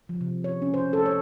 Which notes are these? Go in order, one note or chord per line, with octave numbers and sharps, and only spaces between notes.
F3
C3
C#5
C#4
C5
A4
C#5